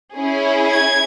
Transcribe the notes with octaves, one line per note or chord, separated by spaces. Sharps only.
C#4 E4 G#4
G#6